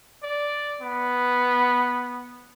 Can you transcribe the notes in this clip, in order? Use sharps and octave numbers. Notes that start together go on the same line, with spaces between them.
D5
B3